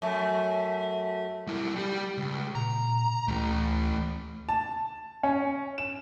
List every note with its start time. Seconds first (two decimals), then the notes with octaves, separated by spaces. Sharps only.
0.02 F#2 A3
1.47 G3 E4
1.76 G3 G4
2.18 C#2
2.55 A#2 A#5
3.28 D2 E3 A3
4.49 A5
5.23 C#4
5.78 E7